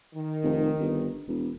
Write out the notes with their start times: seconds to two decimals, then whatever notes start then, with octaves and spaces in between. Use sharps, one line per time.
0.14 D#3
0.44 F1
0.80 G1
1.28 E1